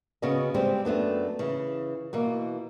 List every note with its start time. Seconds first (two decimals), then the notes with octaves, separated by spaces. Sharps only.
0.22 C#3 B3 C#4 F#4 G#4 D#5
0.54 G3 G#3 C4 G4 C5
0.85 F#2 A3 B3 D4
1.39 C#3 E3
2.13 B2 E3 A#3